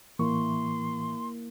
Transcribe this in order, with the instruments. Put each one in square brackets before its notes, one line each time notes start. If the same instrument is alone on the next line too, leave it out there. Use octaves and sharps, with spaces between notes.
[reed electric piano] A2 E3 C#6 [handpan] A#3 E4 [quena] C6